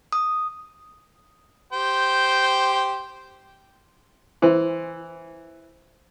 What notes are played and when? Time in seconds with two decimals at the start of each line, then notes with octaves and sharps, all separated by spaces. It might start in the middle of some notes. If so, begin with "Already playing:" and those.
0.13 D#6
1.73 G4 C5 G5
4.42 E3 C5 C6